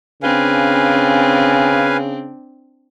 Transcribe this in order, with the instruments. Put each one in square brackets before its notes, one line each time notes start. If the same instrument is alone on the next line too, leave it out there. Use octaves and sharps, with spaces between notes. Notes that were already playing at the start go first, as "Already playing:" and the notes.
[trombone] C#3 [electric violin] C4 D4 [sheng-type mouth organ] B4 F5 G#5